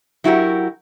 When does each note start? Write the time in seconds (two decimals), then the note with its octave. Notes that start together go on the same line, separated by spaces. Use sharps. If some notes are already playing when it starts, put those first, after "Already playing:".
0.24 F#3 E4 F#4 G4 A#4